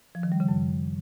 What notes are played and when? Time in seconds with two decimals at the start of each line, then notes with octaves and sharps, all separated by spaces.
0.15 F3
0.23 D#3
0.32 G3
0.40 C#3
0.49 F#2